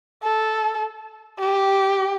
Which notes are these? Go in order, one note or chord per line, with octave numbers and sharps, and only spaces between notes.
A4
G4